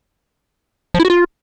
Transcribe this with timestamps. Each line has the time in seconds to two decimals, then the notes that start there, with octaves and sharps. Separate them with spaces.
0.94 F3
1.00 E4
1.05 F#4
1.10 F4